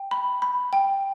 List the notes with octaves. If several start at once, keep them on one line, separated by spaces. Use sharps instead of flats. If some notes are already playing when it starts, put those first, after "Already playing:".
Already playing: G5
B5
B5
G5